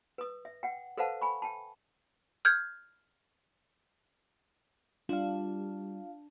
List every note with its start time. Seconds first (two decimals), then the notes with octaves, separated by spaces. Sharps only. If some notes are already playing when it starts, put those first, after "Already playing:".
0.18 B4 D#6
0.45 E5
0.63 F#5 G5
0.97 A4 B4 C5 F5 F#5 A5
1.21 G#5 B5 C#6
1.42 G5 A5
2.45 F6 G6 G#6
5.09 G3 D4 F4 F5